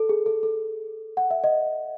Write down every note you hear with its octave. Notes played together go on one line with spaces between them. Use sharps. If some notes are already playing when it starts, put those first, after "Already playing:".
Already playing: A4
G#4
A4
A4
F#5
E5
D#5